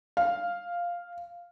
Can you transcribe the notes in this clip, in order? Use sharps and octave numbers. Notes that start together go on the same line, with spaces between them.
F5